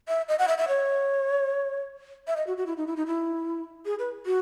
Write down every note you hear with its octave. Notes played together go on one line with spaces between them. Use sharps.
E5
D#5
F#5
E5
E5
C#5
E5
D#5
F#4
F#4
E4
D#4
E4
D#4
E4
G#4
B4
F#4